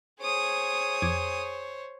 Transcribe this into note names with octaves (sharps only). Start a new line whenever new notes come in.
G#4 C5 C#5 D#6
F2 D6 G#6